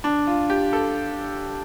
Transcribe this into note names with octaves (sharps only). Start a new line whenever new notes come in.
D4
F4
G4
A4